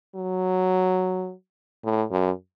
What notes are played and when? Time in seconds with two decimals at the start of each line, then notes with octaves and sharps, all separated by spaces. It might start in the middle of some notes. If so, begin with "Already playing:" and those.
0.15 F#3
1.84 A2
2.11 F#2